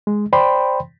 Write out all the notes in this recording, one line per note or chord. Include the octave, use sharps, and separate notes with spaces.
G#3
C5 D5 G5 B5 C6